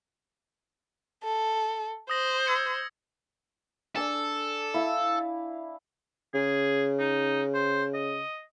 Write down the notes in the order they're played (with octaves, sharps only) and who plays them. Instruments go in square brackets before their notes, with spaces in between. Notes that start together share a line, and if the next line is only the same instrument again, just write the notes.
[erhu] A4
[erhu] C5 [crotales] D#6 A#6 F#7
[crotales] E6 G#6 C#7
[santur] D4 G#5 [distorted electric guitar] A4
[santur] E4 F5
[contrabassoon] C#3 [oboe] G#4
[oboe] D#4
C5
D#5